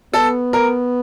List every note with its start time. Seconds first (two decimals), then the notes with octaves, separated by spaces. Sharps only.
0.14 B3 A4
0.53 A#4